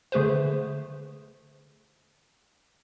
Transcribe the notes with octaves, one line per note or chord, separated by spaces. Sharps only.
D3 A3 G#4 B4 C5